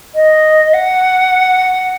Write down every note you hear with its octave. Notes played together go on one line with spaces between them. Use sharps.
D#5
F#5